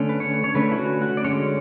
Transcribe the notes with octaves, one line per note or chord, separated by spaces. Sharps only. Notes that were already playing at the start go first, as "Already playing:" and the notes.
Already playing: D3 A3 C#4
B4
C#5
C#5
D3 A3 C#4 B4
E4
F#4
F#4
D5
D3 G#3 C#4 C#5